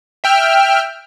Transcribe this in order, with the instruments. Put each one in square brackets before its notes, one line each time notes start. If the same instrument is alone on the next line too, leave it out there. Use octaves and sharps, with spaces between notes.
[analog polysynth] E5 G5 F6